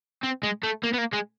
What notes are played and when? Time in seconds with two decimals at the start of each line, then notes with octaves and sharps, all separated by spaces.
0.23 C4
0.43 G#3
0.63 A3
0.84 A#3
0.94 B3
0.98 A#3
1.13 G#3